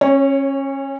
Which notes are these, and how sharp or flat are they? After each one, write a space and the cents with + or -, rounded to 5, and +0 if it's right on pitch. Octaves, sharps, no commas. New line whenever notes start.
C#4 -25 C#5 +0